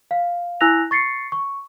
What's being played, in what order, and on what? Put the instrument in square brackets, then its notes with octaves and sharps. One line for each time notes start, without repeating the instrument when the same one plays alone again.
[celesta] F5
E4 G#5 E6 F#6 A#6 F7
C#6 A6 C7 C#7
C#6